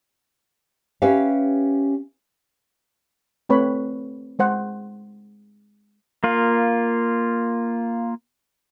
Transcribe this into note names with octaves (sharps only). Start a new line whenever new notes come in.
C#4 G4 B4 E5 F5
A3 C4 B4 C#5 B5
G#3 C5 F#5
A#3 F4